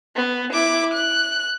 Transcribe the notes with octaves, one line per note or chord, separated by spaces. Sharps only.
B3
E4 D6
F#6